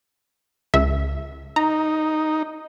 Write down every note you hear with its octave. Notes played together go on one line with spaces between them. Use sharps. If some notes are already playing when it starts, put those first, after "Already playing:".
C#2 E5
D#4 A#5